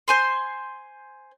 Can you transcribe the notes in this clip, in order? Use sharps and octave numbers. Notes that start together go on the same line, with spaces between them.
C5 G#5 C6